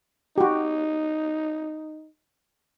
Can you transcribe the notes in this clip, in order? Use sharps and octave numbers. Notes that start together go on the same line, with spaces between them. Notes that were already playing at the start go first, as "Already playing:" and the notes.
D#4 F#4 G4